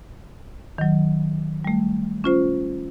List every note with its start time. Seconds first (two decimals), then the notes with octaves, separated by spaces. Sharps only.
0.78 D#3 F#3
1.65 G3 A3
2.24 C#4 F4 C5